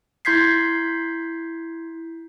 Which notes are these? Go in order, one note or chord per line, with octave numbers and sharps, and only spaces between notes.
E4 C6 G6 G#6 B6 C7